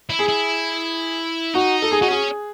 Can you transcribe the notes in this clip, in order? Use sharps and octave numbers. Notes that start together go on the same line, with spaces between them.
E4
G#4
E4
D#4 F#4
A4
G#4
D#4 F#4
C#4 G#4